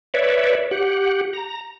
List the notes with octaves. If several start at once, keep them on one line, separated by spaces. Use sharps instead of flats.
B4 C#5 D5 E5
G4 F#5
A#5